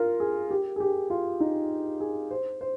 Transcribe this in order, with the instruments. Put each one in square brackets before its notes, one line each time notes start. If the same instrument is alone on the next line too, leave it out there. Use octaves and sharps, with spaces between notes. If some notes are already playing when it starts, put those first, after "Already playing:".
Already playing: [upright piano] F4 A#4
G#4
G4
G#4
G4
F4
D#4
G#4
C5
C5